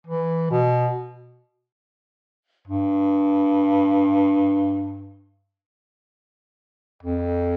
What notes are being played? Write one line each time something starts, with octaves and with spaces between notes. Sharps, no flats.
E3
B2
G2
F2